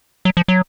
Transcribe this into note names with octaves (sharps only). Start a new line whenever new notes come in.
F#3
F3
F#3